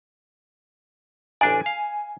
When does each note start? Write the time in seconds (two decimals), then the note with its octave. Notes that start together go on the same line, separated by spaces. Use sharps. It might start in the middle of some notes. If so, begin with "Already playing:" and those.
1.41 A1 D4 D5 G#5
1.66 F5